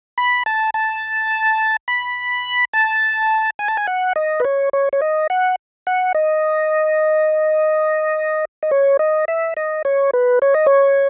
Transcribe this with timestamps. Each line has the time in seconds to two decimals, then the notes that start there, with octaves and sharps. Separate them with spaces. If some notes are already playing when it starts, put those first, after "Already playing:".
0.18 B5
0.46 A5
0.74 A5
1.88 B5
2.73 A5
3.59 G#5
3.68 A5
3.77 G#5
3.87 F#5
4.16 D#5
4.40 B4
4.45 C#5
4.73 C#5
4.93 C#5
5.02 D#5
5.30 F#5
5.87 F#5
6.15 D#5
8.63 D#5
8.71 C#5
8.99 D#5
9.28 E5
9.57 D#5
9.85 C#5
10.13 B4
10.42 C#5
10.54 D#5
10.66 C#5